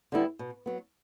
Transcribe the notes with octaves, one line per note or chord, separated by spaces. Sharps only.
D3 G3 B3 E4
B2
F#3 B3